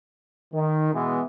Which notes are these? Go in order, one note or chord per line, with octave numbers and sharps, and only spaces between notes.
D#3
B2 E3 G#3 B3